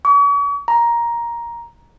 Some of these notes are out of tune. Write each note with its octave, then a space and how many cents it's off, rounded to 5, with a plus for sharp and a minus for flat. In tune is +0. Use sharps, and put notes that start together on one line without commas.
C#6 +45
A#5 +10